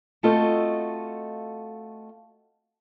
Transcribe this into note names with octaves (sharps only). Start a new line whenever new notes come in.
A3 C4 F4 F#4 A4 D#5